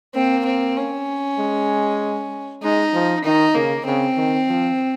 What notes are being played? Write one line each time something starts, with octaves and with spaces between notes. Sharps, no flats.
A#3 C4
C4
C#4
G#3
G#3 D#4
F3
D#3 D#4
C#3 A#3
C#3 C4
D#3
F3